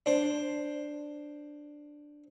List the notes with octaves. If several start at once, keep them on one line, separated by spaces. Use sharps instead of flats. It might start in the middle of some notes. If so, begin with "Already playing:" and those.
D4 C5